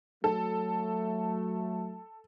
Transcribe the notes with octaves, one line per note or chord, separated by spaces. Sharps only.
F#3 A3 A4